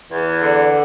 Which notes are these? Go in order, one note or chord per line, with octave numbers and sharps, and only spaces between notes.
E2
D3